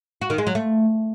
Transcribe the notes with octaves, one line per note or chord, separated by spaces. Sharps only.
F#4
D#3
G#3
F#3
A3